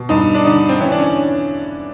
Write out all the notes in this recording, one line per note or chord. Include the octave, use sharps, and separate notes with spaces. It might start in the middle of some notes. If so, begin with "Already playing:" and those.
Already playing: B2
G2 D#4
D4
D3 D#4
C4
E3 C#4
D4
C#4